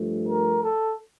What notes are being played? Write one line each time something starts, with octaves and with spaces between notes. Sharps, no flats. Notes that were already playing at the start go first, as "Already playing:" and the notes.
Already playing: G2 F3 A3
A#4
A4